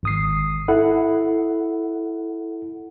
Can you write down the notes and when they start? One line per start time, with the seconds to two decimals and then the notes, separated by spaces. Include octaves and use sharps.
0.03 G#1 D#6 C7
0.68 E4 A4 F#5